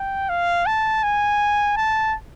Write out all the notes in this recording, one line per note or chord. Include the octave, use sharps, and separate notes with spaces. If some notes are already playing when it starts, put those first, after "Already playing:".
Already playing: G5
F5
A5
G#5
A5